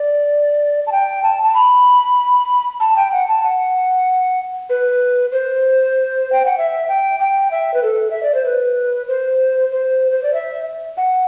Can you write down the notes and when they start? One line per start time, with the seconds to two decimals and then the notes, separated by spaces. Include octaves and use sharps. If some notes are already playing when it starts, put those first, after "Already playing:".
Already playing: D5
0.87 A5
0.92 G5
1.23 A5
1.43 A5
1.55 B5
2.80 A5
2.96 G5
3.12 F#5
3.28 A5
3.43 F#5
4.69 B4
5.32 C5
6.32 G5
6.45 F#5
6.58 E5
6.88 G5
7.20 G5
7.51 E5
7.74 B4
7.83 A4
8.10 E5
8.23 D5
8.34 C5
8.46 B4
9.08 C5
9.71 C5
10.11 C5
10.23 D5
10.33 E5
10.97 F#5